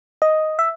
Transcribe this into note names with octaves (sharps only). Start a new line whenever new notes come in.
D#5
E5